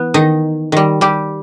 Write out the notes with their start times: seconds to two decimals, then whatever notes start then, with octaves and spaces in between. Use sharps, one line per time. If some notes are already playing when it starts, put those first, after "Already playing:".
Already playing: E3 B3
0.14 D#3 D#4
0.72 D#3 G3
1.01 G3 G4